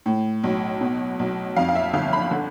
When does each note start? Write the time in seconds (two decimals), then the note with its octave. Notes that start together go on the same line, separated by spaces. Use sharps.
0.06 A2
0.43 B1
0.81 B2
1.19 B1
1.56 F2 F5
1.68 F5
1.75 E5
1.94 G1 F5
2.13 B5
2.31 D3